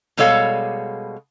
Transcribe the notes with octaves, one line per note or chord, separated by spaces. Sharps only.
B2 G3 G#3 A4 C#5 F5